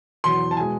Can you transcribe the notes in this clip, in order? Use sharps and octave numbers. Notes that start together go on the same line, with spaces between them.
E2 B2 F#3 C6
A5
B2 G#3 G#5